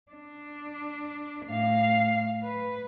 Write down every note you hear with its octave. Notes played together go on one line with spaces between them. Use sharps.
D4
A2 F5
B4